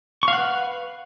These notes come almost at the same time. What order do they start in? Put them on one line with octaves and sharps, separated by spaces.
C#6 F5 F#5 B4